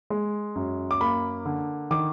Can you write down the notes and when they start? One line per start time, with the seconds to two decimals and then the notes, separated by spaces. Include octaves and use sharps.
0.10 G#3
0.55 F#2
0.91 D6
1.01 A#3 B5
1.45 D3
1.91 D#3 D6